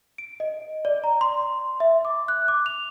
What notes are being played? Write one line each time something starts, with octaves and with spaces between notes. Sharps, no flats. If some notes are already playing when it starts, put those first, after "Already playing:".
D7
D#5
D5
A#5
C6
E5
D6
F#6
D6
F7